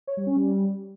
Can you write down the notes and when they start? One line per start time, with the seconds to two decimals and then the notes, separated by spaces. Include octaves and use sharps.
0.07 C#5
0.17 G3
0.26 C#4
0.36 G3